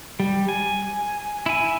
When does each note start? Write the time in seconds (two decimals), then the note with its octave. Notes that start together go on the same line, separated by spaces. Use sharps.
0.20 G3
0.49 G#5
1.46 E4 G#5